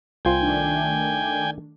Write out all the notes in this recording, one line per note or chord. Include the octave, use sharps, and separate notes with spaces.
C2 F4 C5 G5 G#5
D#3 A3 D4